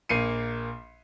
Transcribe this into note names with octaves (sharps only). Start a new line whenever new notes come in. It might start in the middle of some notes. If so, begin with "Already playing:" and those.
A#1 A#3 C7 C#7 D#7